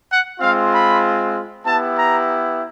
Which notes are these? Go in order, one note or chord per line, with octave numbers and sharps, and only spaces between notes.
F#5
G#3 C4 F4 F5
B5
B3 E4 G4 A5
A#5